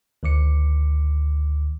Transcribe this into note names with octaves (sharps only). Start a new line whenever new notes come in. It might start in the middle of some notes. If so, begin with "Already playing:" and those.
D2 D#3 D6 C#7